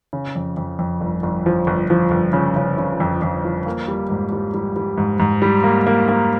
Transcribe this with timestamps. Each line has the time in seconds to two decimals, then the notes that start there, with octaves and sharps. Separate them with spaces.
0.13 C#3
0.35 F2
0.57 F2
0.79 F2
1.01 G1
1.23 G1
1.46 F3
1.67 G1
1.90 F3
2.11 G1
2.33 C#3
2.56 C#3
2.78 C#3
3.00 F2
3.22 F2
3.44 F3
3.66 A#3
3.88 G3
4.10 G#2
4.32 G3
4.54 G3
4.76 G3
4.98 G#2
5.20 G#2
5.42 G3
5.64 A#3
5.87 A#3
6.08 A#3